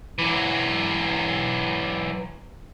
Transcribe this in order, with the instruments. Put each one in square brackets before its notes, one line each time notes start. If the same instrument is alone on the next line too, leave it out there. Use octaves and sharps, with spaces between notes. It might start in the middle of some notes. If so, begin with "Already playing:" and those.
[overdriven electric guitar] E3 F#3